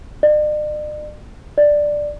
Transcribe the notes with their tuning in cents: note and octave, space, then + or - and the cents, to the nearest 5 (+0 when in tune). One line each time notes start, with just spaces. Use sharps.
D5 +45
D5 +5